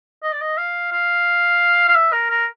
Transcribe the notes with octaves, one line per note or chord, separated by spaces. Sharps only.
D#5
D5
D#5
F5
F5
F5
E5
A#4
A#4